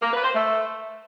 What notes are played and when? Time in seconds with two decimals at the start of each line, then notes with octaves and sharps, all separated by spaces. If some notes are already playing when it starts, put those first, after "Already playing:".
0.02 A#3
0.13 B4
0.24 C5
0.35 A3